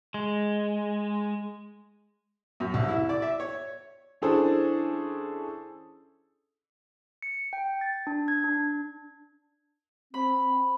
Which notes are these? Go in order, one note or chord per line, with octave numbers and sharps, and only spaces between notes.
G#3
F#2
C2
E4
D5
E5
C#5
E3 C#4 D4 G#4 A4 C5
C#7
G5
A6
D4
G#6
D4
C4 B5